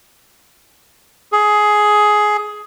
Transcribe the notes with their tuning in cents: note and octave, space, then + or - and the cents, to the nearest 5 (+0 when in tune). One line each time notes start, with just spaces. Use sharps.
G#4 +15